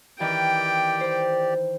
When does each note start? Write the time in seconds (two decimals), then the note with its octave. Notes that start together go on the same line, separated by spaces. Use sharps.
0.20 D#3 E3 G4 D5 G5
1.01 C5